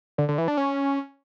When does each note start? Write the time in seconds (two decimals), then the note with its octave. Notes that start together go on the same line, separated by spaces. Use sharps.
0.18 D3
0.29 D3
0.38 E3
0.48 D4
0.57 C#4